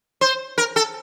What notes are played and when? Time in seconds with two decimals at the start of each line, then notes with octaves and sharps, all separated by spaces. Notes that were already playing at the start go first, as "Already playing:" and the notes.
0.21 C5
0.58 A#4
0.76 A4